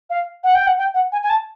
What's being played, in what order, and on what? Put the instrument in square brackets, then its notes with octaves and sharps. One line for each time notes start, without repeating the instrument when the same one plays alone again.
[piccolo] F5
F#5
G5
F#5
G5
F#5
G#5
G#5
A5